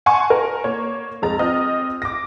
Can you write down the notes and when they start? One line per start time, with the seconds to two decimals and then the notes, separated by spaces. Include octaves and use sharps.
0.06 F#5 G#5 A5 C6 C#6
0.30 A#4
0.64 A#3 C#5
1.22 F1 G#3 A#5 A6
1.39 C4 F4 D#5 F6
2.02 D6 A#6